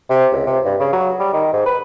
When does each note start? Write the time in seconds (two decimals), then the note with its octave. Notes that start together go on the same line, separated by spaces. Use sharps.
0.10 C3
0.32 C#2
0.47 C3
0.65 G2
0.80 C#3
0.93 F#3
1.19 G3
1.33 D#3
1.53 G#2
1.66 B4